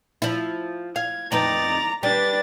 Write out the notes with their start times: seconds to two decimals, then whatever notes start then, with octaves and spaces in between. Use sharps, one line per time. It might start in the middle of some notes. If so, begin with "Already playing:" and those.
0.22 F3 E4
0.96 F5 G#6
1.32 F2 D#4 B4 D5 A#5 A6
2.03 G3 D4 G4 B4 A6